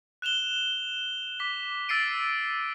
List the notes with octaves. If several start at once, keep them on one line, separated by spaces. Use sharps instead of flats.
F#6 E7 F7 G7
D6 B6
E6 A6 C7 D7 D#7